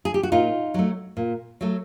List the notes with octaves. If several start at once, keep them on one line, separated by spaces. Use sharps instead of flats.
G#4
G4
F#4
A#2 D#4 F4
F#3 A3
A#2
F#3 A3